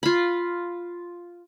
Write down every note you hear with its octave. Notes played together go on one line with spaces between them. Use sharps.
F4 B5